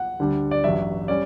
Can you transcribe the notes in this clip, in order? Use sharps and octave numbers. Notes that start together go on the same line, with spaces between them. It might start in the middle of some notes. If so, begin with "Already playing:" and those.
Already playing: F#5
D2 D3 G3 D4
D5
A1 G2 F#3 E5
G3 C#4 D5